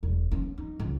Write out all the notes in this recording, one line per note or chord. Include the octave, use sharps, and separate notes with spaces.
E1
B3 C#4
D#4
C#2